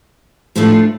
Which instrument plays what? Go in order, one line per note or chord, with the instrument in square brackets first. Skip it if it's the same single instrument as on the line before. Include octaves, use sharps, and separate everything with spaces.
[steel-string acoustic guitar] A2 F3 A3 D4 F4